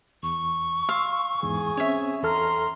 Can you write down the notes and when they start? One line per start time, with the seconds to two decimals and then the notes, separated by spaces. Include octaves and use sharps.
0.23 E2 C#6
0.89 F5 C6 E6
1.43 E2 G#2 G#4
1.77 C4 C#4 C#5 E5
2.23 E2 A4 A#5 C6 F6